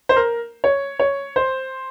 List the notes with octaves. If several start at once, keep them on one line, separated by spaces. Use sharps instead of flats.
C5
A#4
C#5
C#5
C5